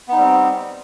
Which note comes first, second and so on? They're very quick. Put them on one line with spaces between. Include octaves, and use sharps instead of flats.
B3 D#4 G3 C4